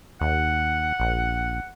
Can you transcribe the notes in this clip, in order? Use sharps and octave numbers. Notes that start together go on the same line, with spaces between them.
D#2 F#5
A#1